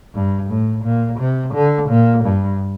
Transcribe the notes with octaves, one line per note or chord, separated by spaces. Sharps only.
G2
A2
A#2
C3
D3
A#2
G2